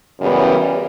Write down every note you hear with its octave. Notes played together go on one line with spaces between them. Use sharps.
F#2 C#3 E3 G3 B3